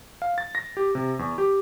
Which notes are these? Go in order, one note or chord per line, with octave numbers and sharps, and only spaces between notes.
F5
A6
A#6
G4
C3
E2
G4